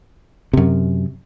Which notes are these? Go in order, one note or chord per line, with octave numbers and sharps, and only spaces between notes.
F#2 C3